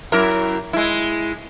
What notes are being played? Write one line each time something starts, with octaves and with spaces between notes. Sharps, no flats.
F#2 E4 A#4
G#3 E4